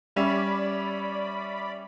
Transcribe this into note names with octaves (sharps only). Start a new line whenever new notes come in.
G3 C#4 D5 E5 B5